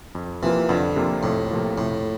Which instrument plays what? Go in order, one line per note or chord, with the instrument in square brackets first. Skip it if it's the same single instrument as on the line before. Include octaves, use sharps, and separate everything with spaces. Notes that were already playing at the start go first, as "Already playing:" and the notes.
[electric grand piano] F2
[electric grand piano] C3 F3 A#3 F4 [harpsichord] E3
[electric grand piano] F2 [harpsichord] D3
[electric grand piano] C3 F3 A#3 F4
[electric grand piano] F2 [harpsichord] A2
[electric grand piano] C3 F3 A#3 F4
[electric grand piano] F2 [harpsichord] A2